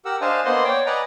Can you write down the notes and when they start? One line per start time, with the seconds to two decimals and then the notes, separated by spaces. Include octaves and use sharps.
0.05 G4 A#4 F#5 E6
0.21 D4 C5 D#5 F5 G#5 A5
0.45 A#3 B3 C5 D#5 F#5 C6
0.64 C#5 D5 G5
0.86 B4 D5 D#5 F#5 G#5 A#5